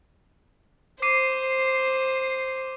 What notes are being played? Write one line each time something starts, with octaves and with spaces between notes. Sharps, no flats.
C5 D6 C7 D#7